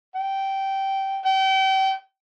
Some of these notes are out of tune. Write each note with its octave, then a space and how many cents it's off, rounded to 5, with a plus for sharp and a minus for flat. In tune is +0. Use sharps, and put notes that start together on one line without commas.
G5 -15
G5 -35